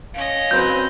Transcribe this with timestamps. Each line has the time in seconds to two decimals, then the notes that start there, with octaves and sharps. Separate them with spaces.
0.15 C#4 D#5 F5
0.51 F#3 C4 B4 G6